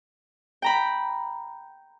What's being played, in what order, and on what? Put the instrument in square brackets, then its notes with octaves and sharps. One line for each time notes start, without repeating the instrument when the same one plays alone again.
[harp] G5 A#5 B5